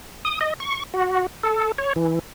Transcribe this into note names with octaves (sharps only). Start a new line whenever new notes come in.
D#6
D#5
C#6
F#4
A4
C#5
E3